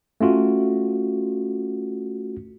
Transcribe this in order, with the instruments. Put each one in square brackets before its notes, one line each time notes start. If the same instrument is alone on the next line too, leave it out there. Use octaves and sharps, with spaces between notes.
[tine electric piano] A3 C#4 F4 F#4